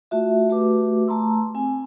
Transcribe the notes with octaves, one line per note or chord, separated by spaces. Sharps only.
A3 F4 F#4 E5
A3 F#4 G4 B4 D6
A3 A5 A#5 C6 E6
C4 G#5